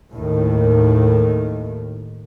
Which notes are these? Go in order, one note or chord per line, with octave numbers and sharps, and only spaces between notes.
D#2 A2 D#3